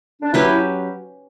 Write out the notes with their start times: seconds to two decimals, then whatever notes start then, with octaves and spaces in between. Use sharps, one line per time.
0.22 D4
0.33 F#3 C#4 E4 G4 B4